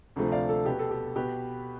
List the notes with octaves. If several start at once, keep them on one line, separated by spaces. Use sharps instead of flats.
D2 C3 F3 A3
D5 F5
A4
B2 B3 G4
A4
G4
B2 G4 B4